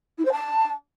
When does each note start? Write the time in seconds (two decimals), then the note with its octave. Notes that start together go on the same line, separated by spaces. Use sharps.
0.18 E4
0.25 C5
0.32 A5